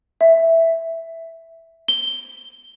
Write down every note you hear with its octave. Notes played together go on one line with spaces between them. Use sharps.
E5
G7